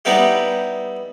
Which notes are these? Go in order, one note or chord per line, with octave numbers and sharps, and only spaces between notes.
G3 B3 D#4 E4 G4